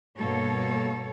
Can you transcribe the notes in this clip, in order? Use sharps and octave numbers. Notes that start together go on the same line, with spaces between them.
G2 B2 A#3 A4 C#5